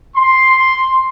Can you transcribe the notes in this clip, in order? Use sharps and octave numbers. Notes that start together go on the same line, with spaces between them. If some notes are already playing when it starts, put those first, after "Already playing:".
C6